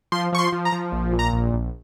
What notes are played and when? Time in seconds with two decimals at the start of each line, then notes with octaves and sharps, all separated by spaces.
0.12 F3 C6
0.32 F3 C#6
0.39 C6
0.52 F3
0.65 A#5
0.72 F3
0.92 A#1
1.13 A#2
1.19 A#5
1.33 A#1
1.53 A#1